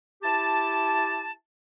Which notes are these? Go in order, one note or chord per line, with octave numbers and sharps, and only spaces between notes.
E4 G4 A5